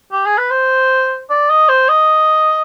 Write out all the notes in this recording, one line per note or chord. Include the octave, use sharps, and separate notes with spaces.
G4
G#4
B4
C5
D5
D#5
C5
D#5